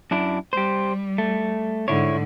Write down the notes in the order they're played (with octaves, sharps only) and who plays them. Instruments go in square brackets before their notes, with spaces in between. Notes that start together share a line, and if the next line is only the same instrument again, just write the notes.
[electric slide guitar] F#2 D4 E4
[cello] G3 [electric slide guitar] G4 C5
[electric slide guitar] A3
[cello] G#2 D3 [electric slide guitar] E4 C#5